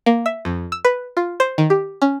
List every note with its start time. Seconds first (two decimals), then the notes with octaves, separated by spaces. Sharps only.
0.06 A#3
0.26 E5
0.45 F2
0.72 E6
0.85 B4
1.17 F4
1.40 C5
1.58 D#3
1.70 G4
2.02 C#4